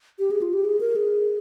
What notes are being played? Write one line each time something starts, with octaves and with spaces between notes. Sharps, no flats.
G4
G#4
F4
G4
G#4
A#4
G#4